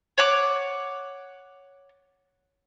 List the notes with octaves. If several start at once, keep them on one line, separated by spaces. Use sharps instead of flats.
C#5 F#5 D6